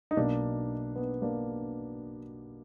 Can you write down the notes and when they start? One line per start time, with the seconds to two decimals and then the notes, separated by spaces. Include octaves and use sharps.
0.11 D#4
0.17 B1 B2 F#3 A#3 D4
0.95 B3
1.22 A#3 D4